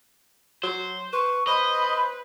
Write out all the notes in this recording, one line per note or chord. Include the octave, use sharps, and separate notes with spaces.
F#3 C5
B4 C#6
B4 C5 D#5 B5